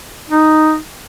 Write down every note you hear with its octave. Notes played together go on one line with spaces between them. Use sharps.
D#4